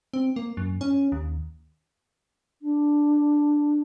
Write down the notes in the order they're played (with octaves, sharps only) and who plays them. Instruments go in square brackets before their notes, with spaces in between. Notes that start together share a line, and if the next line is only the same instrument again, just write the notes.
[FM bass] C4
A#3
F#2
C#4
D#2
[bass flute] D4